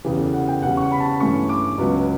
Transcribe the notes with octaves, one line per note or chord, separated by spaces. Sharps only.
E2 C#3 E3 G4
A4
F#5
G5
E2 C#3 G3 F#5
C#6
B5
A5
B5
G2 E3 A3 C#4 C#6
D6
C#2 C#3 F#3 B3